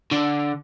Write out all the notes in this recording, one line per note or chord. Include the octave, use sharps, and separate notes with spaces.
D3